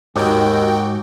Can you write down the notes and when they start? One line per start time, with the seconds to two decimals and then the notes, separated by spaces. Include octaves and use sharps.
0.16 D#2 G#2 D#4 F#4 G4 G5